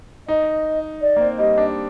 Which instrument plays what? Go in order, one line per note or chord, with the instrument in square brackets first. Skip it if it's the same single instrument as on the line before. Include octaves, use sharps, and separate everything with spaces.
[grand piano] D#4 [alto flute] D#5
[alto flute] D5
[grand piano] A#3
C4
[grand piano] G3 [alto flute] D#5
[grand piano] D4